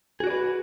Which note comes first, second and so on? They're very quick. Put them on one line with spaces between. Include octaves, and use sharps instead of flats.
G#4 F#4 D5 B4